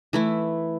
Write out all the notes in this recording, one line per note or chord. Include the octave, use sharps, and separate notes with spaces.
E3 A3 E4